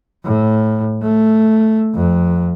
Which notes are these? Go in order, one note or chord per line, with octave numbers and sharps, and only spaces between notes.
A2
A3
F2